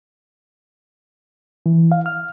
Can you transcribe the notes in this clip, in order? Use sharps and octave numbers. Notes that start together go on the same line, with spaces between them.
E3
F5
F6